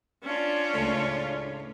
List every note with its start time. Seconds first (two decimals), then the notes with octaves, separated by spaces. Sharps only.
0.23 C#4 D4 F4
0.74 C#2 A2